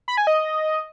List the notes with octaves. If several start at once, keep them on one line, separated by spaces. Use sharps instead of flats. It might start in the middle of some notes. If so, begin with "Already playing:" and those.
B5
G#5
D#5